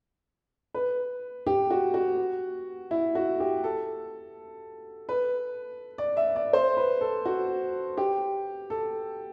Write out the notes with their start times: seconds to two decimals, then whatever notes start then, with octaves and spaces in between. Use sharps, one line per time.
0.74 B4
1.46 G4
1.70 F#4
1.94 F#4
2.91 E4
3.15 F#4
3.40 G4
3.64 A4
5.09 B4
5.98 D5
6.17 E5
6.36 D5
6.53 C5
6.77 B4
7.01 A4
7.25 F#4
7.97 G4
8.70 A4